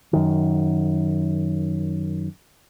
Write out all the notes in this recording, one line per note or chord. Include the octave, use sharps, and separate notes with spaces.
F#2 D#3